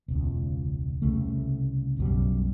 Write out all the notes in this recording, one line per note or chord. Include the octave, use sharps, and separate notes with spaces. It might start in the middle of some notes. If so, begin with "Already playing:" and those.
E1 C#2
C2 C#3 A3
B1 F#2 G3